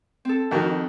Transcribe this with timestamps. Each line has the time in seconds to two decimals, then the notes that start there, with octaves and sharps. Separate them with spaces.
0.25 C4 A4
0.51 F2 D#3 F#4